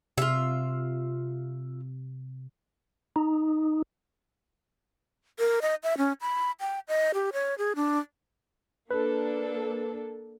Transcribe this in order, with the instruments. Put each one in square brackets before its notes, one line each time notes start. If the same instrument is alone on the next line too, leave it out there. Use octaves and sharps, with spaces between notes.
[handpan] C3 [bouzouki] F4 E5
[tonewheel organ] D#4
[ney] A#4
D#5
E5
C#4
B5
G5
D#5
G4
C#5
G#4
D4
[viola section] A#3 D4 A4 [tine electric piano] B4